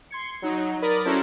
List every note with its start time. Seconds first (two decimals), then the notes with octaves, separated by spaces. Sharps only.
0.11 C6 G#6 C#7
0.42 F#3 D#4
0.82 A#4 D5 B5 D#6 A6
1.05 C#4 E4 F#4 A4 A#4 C5